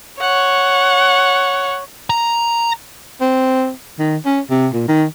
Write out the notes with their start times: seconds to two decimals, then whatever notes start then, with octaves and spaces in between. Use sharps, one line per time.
0.21 C#5 F#5
2.10 A#5
3.21 C4
3.99 D#3
4.25 C#4
4.50 C3
4.73 A#2
4.88 D#3